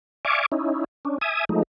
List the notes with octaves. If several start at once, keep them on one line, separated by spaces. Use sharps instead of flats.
D5 E5 F5 G#5 C#6 D6
C#4 D#4 E4
C#4 D4
E5 G#5 D#6
F3 G#3 A3 D#4